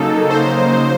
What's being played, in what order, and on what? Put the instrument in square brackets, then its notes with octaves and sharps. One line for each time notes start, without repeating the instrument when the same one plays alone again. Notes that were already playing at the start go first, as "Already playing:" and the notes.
Already playing: [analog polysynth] C#3 F#3 A#3 D#4 A4
C5